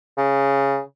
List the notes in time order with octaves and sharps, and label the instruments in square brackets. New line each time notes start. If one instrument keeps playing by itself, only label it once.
[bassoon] C#3